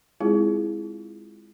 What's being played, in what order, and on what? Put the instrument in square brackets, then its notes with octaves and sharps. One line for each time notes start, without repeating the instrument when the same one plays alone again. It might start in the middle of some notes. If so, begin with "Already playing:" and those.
[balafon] G#3 C4 E4 F4 G#4